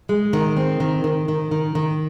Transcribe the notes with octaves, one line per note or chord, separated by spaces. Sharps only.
G#3
D#3
C4
D#3
D#3
D#3
D#3
D#3